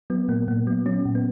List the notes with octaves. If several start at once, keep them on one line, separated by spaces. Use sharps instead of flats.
F#3 B3
A#2 A#3
A#2 A#3
F#3 B3
F#3 C#4
A#2
B3